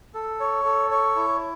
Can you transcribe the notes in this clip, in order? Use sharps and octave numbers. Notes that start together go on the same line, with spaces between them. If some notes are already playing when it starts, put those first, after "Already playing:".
A4
C#5
A4
C#5
E4